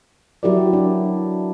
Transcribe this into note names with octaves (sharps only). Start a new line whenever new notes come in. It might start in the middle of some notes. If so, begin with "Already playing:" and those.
F#3 E4 F#4 G4 A#4 D5
D4